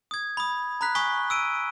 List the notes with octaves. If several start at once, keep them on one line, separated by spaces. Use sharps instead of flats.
D#6 G#6
B5 D#6
A#5 B5 F#6 B6
G#5 C#6 D#6 B6 G7
E6 D7 D#7